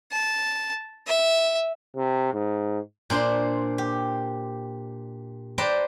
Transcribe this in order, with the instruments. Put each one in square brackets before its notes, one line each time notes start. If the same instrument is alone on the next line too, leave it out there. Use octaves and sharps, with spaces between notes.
[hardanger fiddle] A5
E5
[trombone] C3
G#2
[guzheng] A#2 D4 C5 C6
G4
B4 C5 D5 G5 A5 A#5